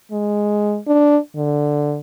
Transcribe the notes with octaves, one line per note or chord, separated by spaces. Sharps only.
G#3
D4
D3